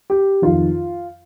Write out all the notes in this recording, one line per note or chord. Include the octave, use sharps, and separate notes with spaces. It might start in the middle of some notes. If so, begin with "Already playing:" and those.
G4
F2 D#3 F4